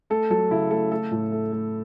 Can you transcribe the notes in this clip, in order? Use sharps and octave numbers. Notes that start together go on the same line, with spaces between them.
A3 A4
F#3 A4
C#3 E4
A3 A4
A3 A4
A2
A3
A3